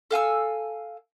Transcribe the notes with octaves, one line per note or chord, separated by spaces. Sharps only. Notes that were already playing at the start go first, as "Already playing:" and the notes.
A4 F5 G#5 E6